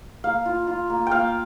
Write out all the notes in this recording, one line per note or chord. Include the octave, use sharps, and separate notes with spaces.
A#3 F5
F4
F4
A#3
A#3 F5 G5